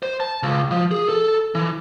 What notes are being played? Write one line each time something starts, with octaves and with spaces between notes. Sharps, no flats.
C5
A5
C#2
F3
G#4
A4
E3